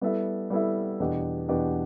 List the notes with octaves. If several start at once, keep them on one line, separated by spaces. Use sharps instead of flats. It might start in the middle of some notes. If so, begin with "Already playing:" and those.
G3 B3 E4 A4 E5
G3 B3 E4 A4 E5
E2 B2 B3 D4 G4
E2 B2 B3 D4 G4